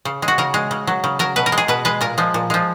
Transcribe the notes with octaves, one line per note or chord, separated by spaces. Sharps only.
C#3
G#3
F#4
C#3 A#4
G#3
C#3
F#3
C#3
F#3 A#4
B2 B4
A#4
G#3
G#4
B2 B4
G#3 B4
A#2 A#4
F3 G#3
A#2
F3 G#3